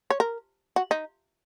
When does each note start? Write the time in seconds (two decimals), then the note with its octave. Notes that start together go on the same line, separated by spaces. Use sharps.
0.10 C#5
0.20 A#4
0.76 F#4
0.91 D#4